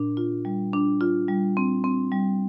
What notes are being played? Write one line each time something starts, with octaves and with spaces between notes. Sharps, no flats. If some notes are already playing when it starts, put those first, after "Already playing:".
Already playing: A#2 D4
F4
G3
D4
F4
G3
C4
C4
G3